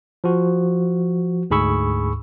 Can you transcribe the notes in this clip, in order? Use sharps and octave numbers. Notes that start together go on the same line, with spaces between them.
F3 F#4
D2 G#2 G#4 B5 C#6 E6